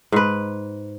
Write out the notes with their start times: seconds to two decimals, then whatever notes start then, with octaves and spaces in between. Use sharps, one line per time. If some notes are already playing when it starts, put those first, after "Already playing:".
0.12 G#2 B4